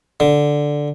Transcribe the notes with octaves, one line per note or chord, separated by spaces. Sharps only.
D3